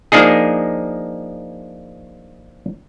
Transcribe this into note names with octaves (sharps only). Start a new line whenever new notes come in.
F3 A#3 D4 D#4 G#4